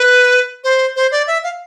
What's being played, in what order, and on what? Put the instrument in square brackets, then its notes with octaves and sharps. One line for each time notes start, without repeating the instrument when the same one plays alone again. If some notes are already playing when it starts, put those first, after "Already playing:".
Already playing: [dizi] B4
C5
C5
D5
E5
F5